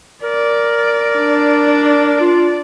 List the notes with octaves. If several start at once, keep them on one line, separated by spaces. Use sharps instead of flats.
A#4 D5
D4
F4